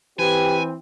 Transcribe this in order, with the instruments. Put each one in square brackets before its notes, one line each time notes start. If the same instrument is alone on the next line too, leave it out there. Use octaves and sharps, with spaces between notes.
[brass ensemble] E3 C4 [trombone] G4 [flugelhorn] B4 [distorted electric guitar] G#5